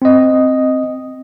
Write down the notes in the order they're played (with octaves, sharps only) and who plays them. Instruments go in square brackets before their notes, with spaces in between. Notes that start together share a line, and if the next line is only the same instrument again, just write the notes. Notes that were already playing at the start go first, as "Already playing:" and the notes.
[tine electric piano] C4 D#5